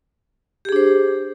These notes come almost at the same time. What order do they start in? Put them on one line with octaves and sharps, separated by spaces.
G4 G#4 D4 C5